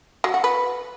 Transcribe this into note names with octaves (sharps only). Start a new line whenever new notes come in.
F#3
F#4
B4